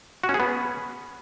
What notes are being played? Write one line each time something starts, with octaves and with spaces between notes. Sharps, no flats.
F#4
C#4
G#4
B3